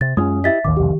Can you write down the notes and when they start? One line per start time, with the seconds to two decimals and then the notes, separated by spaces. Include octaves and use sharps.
0.01 C3 A6
0.17 F#2 G#3 C4 C#4 F4 D#6
0.44 E4 G4 D#5 E5 A6 B6
0.65 A1 D#2 D#3 D6
0.77 E1 C2 F2 G4